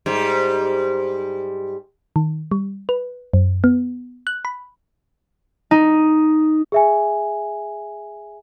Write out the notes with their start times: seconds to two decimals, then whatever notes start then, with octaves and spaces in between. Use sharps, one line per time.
0.06 G#2 G3
2.16 D#3
2.51 G3
2.89 B4
3.34 F#2
3.64 B3
4.27 F#6
4.45 B5
5.71 D#4
6.72 G#4 E5 G#5